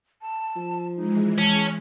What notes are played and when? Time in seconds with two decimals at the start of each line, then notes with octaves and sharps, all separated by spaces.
0.22 A5
0.56 F3
0.97 E3 G#3 D#4
1.38 C#4 A5